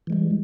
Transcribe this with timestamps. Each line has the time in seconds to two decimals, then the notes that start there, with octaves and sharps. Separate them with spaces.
0.07 E3
0.10 G#3
0.12 G3